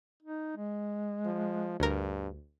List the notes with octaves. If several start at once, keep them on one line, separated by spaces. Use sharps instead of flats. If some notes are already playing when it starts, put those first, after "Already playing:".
D#4
G#3
F3
D2 G2 A#4